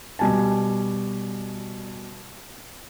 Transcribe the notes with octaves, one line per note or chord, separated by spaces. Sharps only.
B2 G3 G#5 A5